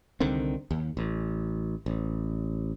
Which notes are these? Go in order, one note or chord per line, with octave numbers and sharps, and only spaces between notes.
C2 D3 D#3 C4
D#2
A1
A1